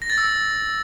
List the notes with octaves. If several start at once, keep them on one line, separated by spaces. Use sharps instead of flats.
A#6
A6
E6